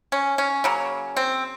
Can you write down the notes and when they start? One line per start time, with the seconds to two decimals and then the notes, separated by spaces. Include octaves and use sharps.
0.12 C#4
0.38 C#4
0.64 C#3 F#3 A#3
1.17 C4